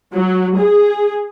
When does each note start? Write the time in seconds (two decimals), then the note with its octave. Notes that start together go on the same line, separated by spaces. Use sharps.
0.13 F#3
0.58 G#4